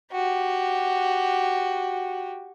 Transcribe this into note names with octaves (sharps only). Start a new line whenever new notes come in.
F#4 G4